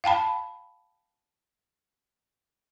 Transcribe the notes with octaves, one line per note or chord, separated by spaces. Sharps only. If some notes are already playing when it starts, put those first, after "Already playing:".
F5 G5 A5 B5